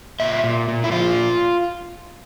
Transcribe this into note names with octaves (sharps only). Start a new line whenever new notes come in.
A#2 E5
A#2
A#2
E4
F3 F4